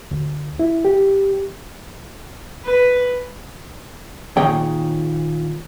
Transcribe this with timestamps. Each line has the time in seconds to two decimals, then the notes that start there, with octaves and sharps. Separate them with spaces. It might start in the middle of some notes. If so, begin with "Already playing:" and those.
0.11 D2
0.59 E4
0.85 G4
2.65 B4
4.37 A#2 D#3 G#4 C#5 G5